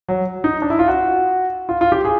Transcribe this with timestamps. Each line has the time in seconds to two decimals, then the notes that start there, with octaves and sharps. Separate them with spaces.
0.08 F#3
0.44 D#4
0.62 D4
0.70 E4
0.79 F4
0.88 F#4
1.69 F4
1.81 F4
1.92 G4
2.05 G#4